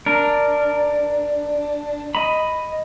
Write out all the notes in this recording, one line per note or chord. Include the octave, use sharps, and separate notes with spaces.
D4 A#4
D#5 B5